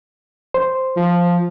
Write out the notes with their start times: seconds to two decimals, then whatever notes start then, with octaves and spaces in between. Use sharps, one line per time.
0.54 C5
0.96 F3